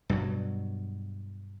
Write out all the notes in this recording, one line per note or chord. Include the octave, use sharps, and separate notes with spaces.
G2 B2 F#3